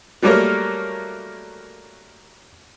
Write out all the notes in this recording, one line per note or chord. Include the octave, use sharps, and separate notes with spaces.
F#3 G3 A3 A#3 A#4 C#5